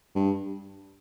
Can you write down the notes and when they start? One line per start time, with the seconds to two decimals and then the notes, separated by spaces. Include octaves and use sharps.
0.15 G2